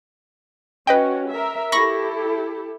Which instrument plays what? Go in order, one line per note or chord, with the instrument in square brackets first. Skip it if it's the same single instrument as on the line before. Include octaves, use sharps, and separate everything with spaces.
[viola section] C#4 F#4 [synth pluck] B4 D#5 G5
[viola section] A#4 E5
[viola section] E4 G4 A4 [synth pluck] B5 C#6 A#6